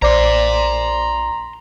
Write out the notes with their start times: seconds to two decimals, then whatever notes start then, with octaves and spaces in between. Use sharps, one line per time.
0.02 A#1 C5 D5 A#5 C6 D6